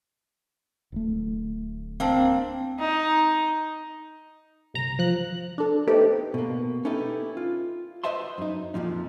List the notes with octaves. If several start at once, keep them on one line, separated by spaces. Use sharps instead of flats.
D1 A3
A#3 C4 D4
D#4
G1 C2 A#5
F3 F#6
D4 A4
A3 B3 C4 D#4 G4 A4
B2 A#3
C#4 D#4 E4 G4 A4 B4
F4
B4 C5 D#5 E5 A5 C6
F#2 D#4
F2 A#2 F3 D#4